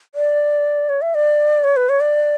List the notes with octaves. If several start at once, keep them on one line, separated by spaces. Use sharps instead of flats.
D5
C#5
E5
D5
C#5
B4
C#5
D5